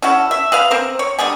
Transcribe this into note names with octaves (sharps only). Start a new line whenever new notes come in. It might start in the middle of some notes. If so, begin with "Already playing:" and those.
C#4 E4 F#4 A4
E5
G#4 B4 F5
C4 A#4 C5
C#5
D3 G3 G#4 G#5